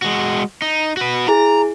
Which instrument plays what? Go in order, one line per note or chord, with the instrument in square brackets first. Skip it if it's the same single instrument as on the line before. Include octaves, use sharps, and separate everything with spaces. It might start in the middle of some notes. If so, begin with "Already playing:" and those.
[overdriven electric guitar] G#3 F#4
D#4
F#4 B4
[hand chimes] E4 G#4 [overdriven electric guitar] A#5